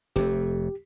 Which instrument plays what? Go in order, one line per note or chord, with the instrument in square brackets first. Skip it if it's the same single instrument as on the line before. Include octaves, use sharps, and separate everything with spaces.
[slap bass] F1 F2 A3 [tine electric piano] G4